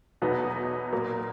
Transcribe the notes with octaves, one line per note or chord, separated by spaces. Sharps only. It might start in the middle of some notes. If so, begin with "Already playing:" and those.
E2 B2 F#3 B3 D#4
A#2 F#3 A#3